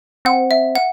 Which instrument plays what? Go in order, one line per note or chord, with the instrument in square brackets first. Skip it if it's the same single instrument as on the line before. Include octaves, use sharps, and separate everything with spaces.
[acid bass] C4 [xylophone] F#5
[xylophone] E5
F#5